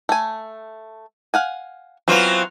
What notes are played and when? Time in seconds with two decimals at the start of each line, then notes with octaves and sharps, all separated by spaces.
0.09 A3 G#5
1.34 F5 F#5 G#5
2.08 E3 F#3 B3 C4 F4